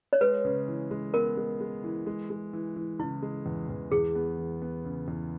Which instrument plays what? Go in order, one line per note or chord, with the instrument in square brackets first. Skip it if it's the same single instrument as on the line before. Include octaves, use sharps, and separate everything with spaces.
[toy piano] C#5
[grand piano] G#3 [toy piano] B4
[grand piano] C#3
E3
G#3
[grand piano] B3 [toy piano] A#4
[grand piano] G#3
G#3
E3
G#3
G#3
E3
E3
[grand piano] C#3 [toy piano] E4
[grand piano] G#3
E2
E2
[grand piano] E2 [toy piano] G#4
[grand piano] B3
E3
B3
C#3
E2